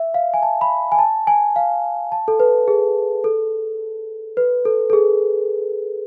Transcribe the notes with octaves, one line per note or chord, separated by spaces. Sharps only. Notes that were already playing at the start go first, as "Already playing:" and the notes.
Already playing: E5
F5
G#5
A5
B5
G#5
A5
G#5
F5
A5
A4
B4
G#4
A4
B4
A4
A4
G#4